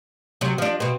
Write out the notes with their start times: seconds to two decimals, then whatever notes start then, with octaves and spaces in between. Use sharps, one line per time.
0.41 C3 F#3
0.58 F3 D4
0.80 B2 C4